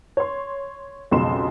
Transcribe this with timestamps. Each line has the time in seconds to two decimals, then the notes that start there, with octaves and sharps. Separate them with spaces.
0.17 C#5 C6
1.11 B1 F2 C#3 G#3 C6 E7